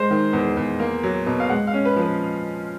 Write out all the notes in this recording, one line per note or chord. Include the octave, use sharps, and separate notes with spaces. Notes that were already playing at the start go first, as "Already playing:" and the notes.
Already playing: G#3 C5
D#3
E2
E2
A#3
F#3
B2
F5
G#3 F#5
F5
C#4
B4
F3
B4